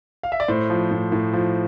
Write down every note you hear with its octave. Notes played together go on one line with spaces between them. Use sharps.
F5
E5
D5
A2 C5
F3
A2
A2
F3